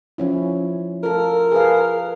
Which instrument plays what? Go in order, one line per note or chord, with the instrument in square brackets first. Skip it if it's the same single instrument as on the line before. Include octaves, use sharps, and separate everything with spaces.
[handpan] F3 C#4 E4
[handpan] F4 A4 [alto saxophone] A#4
[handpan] G#4 B4 F5